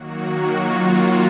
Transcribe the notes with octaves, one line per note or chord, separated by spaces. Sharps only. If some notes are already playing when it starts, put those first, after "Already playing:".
Already playing: D#3 F#3 A#3 F#4
F4
F#4